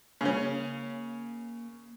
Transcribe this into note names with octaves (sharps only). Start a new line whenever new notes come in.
C#3 A#3 C#4